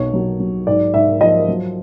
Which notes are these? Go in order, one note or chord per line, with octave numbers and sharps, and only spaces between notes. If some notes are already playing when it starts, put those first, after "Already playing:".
Already playing: B1 C#5
F#3
F#3
G#2 D5
G#2 E5
F3 D#5
F#3